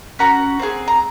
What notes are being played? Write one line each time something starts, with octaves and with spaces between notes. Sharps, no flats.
C#4 F#4 F#5 A#5
C4 F4 G#4
A#5